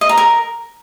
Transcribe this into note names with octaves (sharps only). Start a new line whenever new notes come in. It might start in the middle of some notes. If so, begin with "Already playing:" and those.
D#5
A#5
A#4